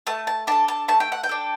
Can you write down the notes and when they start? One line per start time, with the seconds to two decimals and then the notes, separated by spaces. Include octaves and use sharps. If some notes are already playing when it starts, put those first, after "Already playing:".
0.07 A3 A5
0.27 A5
0.47 D4 A4 A5
0.68 A5
0.88 A3 A5
1.00 G5
1.12 F#5
1.23 G5
1.29 D4 A4